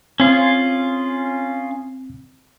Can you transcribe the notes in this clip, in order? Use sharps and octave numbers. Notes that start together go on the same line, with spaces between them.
C4 C#4 F4 G#4